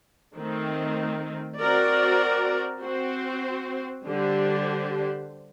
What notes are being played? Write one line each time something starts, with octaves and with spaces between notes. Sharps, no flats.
D#3 A3 C4
C4 F#4 A#4 D5
C4 F#4 C5
D3 G3 D4 G4 C5